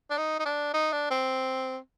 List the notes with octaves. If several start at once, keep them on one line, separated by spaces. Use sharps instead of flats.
D4
D#4
D#4
D4
D#4
D4
C4